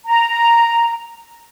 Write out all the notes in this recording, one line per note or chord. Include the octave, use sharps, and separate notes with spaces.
A#5